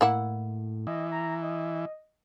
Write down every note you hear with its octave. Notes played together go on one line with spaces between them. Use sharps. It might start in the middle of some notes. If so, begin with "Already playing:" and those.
A2 A#3 E4 F#5
E3 D#5
A#5
D#5